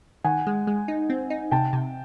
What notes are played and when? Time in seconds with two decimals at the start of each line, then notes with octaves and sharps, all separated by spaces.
0.24 D#3 F#5 G#5
0.47 G#3
0.67 G#3
0.88 D#4
1.10 C4
1.30 D#4
1.51 C3 G5 A5
1.73 C3